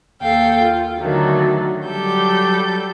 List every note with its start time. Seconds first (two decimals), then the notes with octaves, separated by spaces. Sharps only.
0.21 D#2 A4 F5 G5
0.61 F4
1.00 D3 D#3 F#3 A3
1.84 F#3 G3 G4 A4 G6